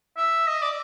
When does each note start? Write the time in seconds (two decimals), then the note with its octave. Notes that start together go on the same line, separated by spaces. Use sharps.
0.17 E5
0.47 D#5
0.62 D5